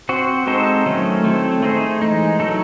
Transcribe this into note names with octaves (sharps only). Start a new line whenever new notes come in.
C4 F#4 C5
G#3 C4 D#4 A4 C5
D#3 F#3 A3 C#4
A3 C4 E4 A4
A3 D#4 G#4 C5
E3 G#3 D#4
F#3 A3 D#4 A4